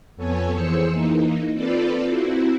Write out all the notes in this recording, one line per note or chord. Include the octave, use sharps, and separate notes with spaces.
F2 B3 A4 C#5 G#5
E3 G#4 C5 E6 C#7
E3 A#3 D#4
C4 F4 A4 B4 D5
C4 E4 F#4